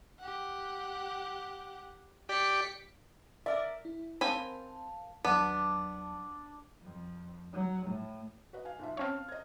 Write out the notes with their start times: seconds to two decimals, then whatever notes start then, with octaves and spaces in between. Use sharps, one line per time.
0.19 G4 F#5
2.29 G4 D5 B6 C#7
3.46 A#4 D5 E5
3.85 E4
4.21 C4 A#4 F5 G#5 A5 B5
5.25 D#2 F#3 B3 D4 A5
6.83 F2
7.53 F#3
7.86 A2
8.53 F#4 B4 D#5
8.65 F5 G#5
8.79 B1 F4 E5
8.97 C4 C#4 C#5 F5 A5 F6
9.28 D#5 G#6